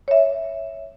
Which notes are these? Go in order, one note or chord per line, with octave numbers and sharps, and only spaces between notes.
C#5 E5